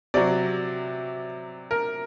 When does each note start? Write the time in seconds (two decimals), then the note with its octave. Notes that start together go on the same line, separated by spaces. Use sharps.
0.14 C3 F#3 D5
1.71 A#4